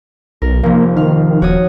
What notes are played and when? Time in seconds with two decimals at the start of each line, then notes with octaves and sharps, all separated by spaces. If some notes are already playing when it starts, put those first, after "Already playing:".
0.42 B1 A#4
0.63 F1 F3 A#3
0.97 D#3 F5
1.42 D#1 F#4 C#5 D#6